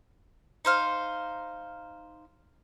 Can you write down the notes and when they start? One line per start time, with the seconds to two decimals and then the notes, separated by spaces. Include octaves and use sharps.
0.65 D#4 C5 F5